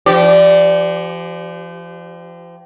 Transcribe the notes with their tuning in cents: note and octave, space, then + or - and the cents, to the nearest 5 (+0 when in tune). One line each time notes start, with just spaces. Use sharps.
F3 -35 G4 -25 D5 +0